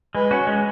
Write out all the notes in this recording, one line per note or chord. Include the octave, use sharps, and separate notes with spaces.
G#3 B4
C#4 F#4
G#3